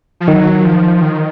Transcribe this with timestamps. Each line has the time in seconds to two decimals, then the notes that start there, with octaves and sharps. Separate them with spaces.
0.20 F3
0.27 D#3 F#3
0.65 F3
1.02 D#3